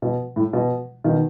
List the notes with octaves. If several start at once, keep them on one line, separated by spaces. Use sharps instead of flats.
B2
A2
B2
B2 D#3